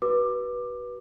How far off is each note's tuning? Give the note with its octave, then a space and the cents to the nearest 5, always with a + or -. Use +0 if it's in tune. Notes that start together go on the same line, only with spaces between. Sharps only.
F#4 +35 B4 -20 D6 +15